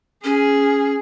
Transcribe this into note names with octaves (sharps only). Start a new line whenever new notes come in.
C#4 G#4